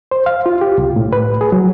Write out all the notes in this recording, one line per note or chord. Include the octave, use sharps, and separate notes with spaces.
C5
F5
F4
G4
C2
A2
B4
G#4
F#3